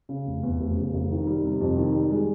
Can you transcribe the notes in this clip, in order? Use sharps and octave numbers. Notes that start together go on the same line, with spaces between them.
C#3
F1
E2
F1
C#3
F1
D#3
G3
C3
F2
D#3
G3
G#3